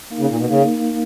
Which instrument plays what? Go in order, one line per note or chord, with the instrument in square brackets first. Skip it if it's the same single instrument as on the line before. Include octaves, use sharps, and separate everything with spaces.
[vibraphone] A#3 D#4 A#4 F5
[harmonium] C#3
A#2
B2
[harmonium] C#3 [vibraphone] A#3 D#4 A#4 F5